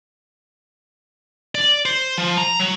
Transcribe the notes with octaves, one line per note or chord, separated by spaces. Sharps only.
D5
C5
F3
A#5
F#3